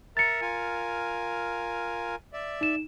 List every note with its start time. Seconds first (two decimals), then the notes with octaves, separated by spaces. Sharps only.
0.17 A#4 E5 A#5 A6 C#7
0.42 F4 A#4 G#5
2.33 D5 E5
2.61 D#4 E7